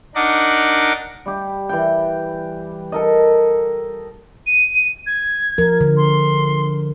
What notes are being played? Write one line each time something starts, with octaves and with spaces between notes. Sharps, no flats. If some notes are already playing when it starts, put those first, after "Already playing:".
D4 D#4 A#4 F#5 D6
G3 G4
E3 G3 G5
A4 A#4 D#5
D#7
G#6
F3 A#4
D3
C6